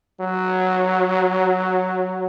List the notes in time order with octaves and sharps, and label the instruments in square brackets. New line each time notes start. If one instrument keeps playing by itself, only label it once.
[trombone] F#3